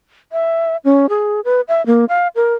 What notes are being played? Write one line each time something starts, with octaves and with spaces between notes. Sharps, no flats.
E5
C#4
G#4
B4
E5
A#3
F5
A#4